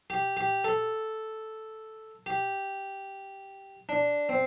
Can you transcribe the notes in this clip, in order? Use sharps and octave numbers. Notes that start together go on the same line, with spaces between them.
G4
G4
A4
G4
D4
C4